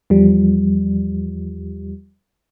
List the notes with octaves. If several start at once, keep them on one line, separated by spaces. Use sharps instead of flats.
E2 F3 G3